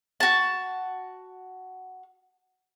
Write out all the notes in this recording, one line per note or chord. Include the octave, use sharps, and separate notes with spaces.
F#4 A5